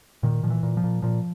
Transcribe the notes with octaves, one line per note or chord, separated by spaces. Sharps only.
A#2 D#3
A#2 F3
E3
A#2
F3
A#2
A#2 F3